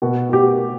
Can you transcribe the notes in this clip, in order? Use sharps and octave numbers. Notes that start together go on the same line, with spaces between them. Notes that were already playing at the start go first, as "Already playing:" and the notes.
B2 F#4
F#4
G4